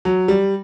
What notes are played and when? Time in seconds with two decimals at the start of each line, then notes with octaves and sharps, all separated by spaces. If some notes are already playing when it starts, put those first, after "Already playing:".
0.05 F#3
0.28 G3